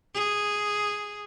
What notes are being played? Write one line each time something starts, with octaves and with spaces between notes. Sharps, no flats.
G#4